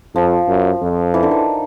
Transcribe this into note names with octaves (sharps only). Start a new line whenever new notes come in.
F2 F3
F#2
F2
E3
D3
D#3